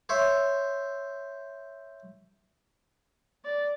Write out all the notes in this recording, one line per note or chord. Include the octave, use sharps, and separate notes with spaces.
C5 C#5 E5
D5